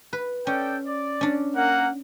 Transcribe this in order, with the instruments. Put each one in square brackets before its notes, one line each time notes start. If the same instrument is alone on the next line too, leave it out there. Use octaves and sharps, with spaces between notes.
[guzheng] B4
[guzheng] C#4 [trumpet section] A4 D5 G5
[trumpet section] D5
[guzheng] C#4 D4
[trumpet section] A#3 A#4 F#5